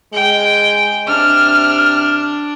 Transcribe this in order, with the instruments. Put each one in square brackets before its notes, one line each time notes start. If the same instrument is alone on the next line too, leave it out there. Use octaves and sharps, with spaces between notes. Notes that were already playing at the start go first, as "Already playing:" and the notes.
[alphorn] G#3 [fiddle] G5
[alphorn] C3 [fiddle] D4 [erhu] F6